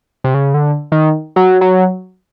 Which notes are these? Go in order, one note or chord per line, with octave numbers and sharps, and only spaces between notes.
C3
C#3
D3
D#3
F#3
F#3